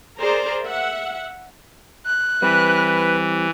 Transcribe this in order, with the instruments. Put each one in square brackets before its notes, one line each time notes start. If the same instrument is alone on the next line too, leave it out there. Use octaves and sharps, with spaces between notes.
[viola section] G#4 A#4 C5 D5 A#5
E5 F#5
[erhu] F#6
[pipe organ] E3 [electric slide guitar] G3 C4 [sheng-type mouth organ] B4